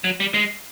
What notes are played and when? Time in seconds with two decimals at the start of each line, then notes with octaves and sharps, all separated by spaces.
0.04 F#3
0.20 G3
0.34 G#3